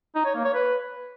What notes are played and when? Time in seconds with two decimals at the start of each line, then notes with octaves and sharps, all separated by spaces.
0.15 D#4
0.25 C#5
0.35 A#3
0.45 C#5
0.54 B4